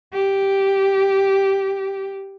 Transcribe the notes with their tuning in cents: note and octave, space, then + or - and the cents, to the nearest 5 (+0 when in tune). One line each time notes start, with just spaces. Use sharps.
G4 -5